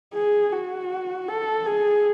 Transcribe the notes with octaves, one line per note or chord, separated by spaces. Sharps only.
G#4
F#4
A4
G#4